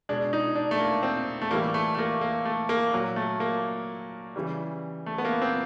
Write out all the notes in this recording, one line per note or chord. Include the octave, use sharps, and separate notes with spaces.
B2 G#3 D4
D#4
D4
A3
A#3
C4
A3
A2 E3 G3 A#3
A3
A3
A#3
A#3
A3
A#3
A#2 F#3
A3
A#3
C#3 E3 G3
A3
B3
A#3
C4